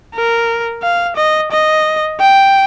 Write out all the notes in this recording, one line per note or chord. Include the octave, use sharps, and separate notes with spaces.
A#4
F5
D#5
D#5
G5